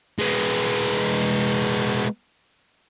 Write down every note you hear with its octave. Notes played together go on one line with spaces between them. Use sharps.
G#3 B3